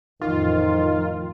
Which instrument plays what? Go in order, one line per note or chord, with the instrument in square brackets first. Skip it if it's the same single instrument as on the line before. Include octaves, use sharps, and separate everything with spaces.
[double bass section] A1 F2 F3 [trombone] D#3 [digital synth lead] F4